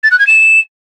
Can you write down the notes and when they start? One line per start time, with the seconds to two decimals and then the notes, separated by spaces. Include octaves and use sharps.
0.03 A6
0.11 F#6
0.19 G#6
0.27 E7